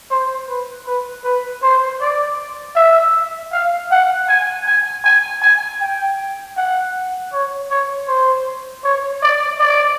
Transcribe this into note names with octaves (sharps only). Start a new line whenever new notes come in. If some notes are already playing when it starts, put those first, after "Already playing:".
C5
B4
B4
B4
C5
D5
E5
F5
F#5
G#5
G#5
G#5
G#5
G5
F#5
C#5
C#5
C5
C#5
D5
D5